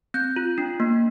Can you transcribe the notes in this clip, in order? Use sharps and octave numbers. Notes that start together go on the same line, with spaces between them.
C4 G6
F4
D4
A#3